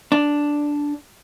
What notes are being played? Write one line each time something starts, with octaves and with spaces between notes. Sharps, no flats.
D4